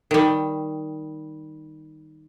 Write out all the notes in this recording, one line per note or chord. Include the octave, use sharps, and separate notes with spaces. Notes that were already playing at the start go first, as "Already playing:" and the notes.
D#3 G3